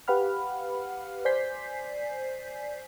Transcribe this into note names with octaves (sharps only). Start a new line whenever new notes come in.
G4 B4 F5 F#5 B5 F6
C5 D5 G#5 G6 B6 C7